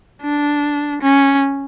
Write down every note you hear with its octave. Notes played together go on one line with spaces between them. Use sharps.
D4
C#4